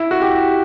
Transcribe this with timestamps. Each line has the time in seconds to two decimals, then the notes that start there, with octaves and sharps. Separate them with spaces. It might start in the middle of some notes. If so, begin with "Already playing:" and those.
Already playing: E4
0.11 F#4
0.22 G4